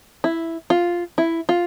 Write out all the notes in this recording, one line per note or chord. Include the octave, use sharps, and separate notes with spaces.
E4
F4
E4
F4